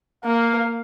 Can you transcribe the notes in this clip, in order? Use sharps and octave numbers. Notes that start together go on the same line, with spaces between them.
A#3 F5